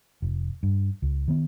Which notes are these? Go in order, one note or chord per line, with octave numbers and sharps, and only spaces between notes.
F1
G2
C#2
D#3 B3